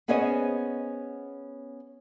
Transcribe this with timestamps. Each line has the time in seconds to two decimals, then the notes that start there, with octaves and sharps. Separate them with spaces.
0.08 B3 C#4 G#4 C5 C#5 D#5